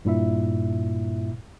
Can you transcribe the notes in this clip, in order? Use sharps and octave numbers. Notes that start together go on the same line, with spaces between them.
G2 A#2 E4 E5